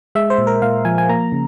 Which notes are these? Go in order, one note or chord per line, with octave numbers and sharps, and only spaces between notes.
G#3 E5
C5
A#2
A#4
A#2 F5
F3 G#5
G#5
A#3 A#5
C#3